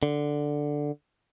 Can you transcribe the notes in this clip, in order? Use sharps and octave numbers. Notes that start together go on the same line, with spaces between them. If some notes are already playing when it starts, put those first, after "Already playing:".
D3